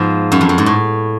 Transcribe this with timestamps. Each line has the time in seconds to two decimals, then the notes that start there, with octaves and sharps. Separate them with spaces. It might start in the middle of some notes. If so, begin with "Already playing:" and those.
Already playing: G#2 F3 B3
0.32 F#2
0.41 F2
0.49 F#2
0.58 G#2
0.66 A2